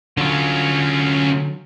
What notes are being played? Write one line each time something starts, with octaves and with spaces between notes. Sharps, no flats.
D3 F#3 C#4 F4